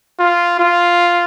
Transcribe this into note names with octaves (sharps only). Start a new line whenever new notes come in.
F4
F4